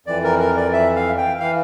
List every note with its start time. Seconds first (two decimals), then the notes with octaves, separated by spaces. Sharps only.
0.06 F2 E3 D5
0.24 A#4
0.40 A#4
0.56 D5
0.73 E5
0.96 F5
1.17 G5
1.40 E3 F5